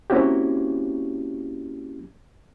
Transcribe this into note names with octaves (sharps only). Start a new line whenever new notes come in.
A#3 C4 C#4 E4 F#4 G4